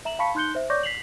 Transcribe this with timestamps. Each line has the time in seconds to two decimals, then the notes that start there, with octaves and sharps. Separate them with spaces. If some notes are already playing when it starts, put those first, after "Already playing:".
0.05 E5 A#5 E7 F#7
0.19 F5 A5 B5 C#6 B6 C#7
0.35 D#4 C6 F#6 G6 C#7 G7
0.55 C5 E5
0.70 C#5 D5 C#6 D6 G6 A#6
0.83 B6 C7 F7 F#7